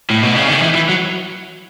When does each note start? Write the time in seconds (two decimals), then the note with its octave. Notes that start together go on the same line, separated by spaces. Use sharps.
0.10 A2
0.23 B2
0.35 C#3
0.48 D#3
0.61 E3
0.75 E3
0.89 F#3